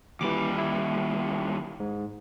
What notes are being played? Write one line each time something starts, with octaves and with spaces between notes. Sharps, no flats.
D#2 E3 G3 D6
E4
G#2